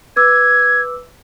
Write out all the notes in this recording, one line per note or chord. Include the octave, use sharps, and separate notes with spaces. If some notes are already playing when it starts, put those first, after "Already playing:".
B4 D6 E6 G#6